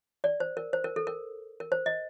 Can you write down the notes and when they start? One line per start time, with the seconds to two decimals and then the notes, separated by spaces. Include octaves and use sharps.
0.24 D5
0.40 C5
0.57 A#4
0.73 C5
0.84 A#4
0.96 A4
1.07 A#4
1.60 A#4
1.72 C5
1.86 D#5